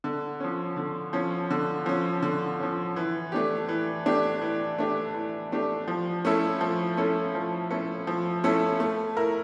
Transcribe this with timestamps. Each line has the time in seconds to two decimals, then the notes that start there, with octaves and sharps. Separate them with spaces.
0.04 D3
0.40 F3 C#4
0.77 D3
1.13 F3 C#4
1.51 D3
1.86 F3 C#4
2.23 D3
2.60 F3 C#4
2.96 E3
3.32 A3 D4 G4
3.68 E3
4.06 A3 D4 G4
4.41 E3
4.78 A3 D4 G4
5.15 E3
5.52 A3 D4 G4
5.88 F3
6.25 A3 C#4 E4 A4
6.61 F3
6.97 A3 C#4 E4 A4
7.35 F3
7.70 A3 C#4 E4 A4
8.07 F3
8.44 A3 C#4 E4 A4
8.80 A3
9.17 E4 A#4